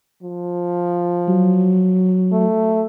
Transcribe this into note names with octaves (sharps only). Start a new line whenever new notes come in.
F3
F#3
A3